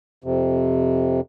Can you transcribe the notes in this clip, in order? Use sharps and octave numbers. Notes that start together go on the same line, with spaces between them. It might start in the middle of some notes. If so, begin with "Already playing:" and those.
F2 C3